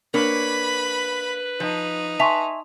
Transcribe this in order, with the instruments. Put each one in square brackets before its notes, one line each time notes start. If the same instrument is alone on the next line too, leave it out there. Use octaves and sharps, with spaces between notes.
[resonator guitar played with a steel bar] A#3 C#5 D5 [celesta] D4 A#4 [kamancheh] B4 [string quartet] B5
[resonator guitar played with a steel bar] F3 [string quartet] D#4
[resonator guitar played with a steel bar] E5 G#5 A5 [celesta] C6 C#6 F7